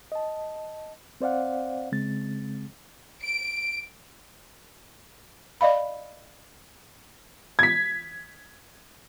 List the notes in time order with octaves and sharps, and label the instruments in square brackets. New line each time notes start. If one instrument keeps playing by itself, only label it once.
[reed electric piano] D#5 A5
C4 C5 D5 F5 F#5
C#3 G#3 C4 A6
[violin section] D7
[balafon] D5 D#5 F5 B5
[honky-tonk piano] G#6 B6